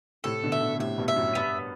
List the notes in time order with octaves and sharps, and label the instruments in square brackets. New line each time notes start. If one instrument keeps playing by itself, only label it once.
[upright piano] A2 C3 [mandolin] A4
[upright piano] B2 D3
[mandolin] E5
[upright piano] B2 D3
[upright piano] A2 C3 [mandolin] E5
[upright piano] G2 B2
[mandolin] E5
[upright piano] F#2 A2
[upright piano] G2 [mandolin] B3